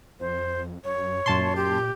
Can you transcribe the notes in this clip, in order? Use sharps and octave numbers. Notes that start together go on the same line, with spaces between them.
F2 C5
F#2 C#5
F#2 A#2 A5 C6
G4